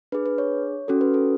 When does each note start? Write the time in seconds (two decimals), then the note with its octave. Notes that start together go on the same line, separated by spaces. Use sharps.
0.12 D4 G#4 B4
0.26 B4
0.38 C#5
0.88 C#4 F#4 A4
1.01 B4
1.14 A4